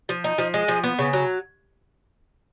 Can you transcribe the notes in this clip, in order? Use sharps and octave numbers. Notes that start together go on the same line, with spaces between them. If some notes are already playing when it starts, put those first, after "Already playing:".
F3
D#4
F3
G#3
F3
B3
C#3
F#3